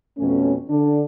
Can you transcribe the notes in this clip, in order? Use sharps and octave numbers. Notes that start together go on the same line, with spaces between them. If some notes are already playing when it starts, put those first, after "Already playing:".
F2 B2 A3 C#4
D3 D4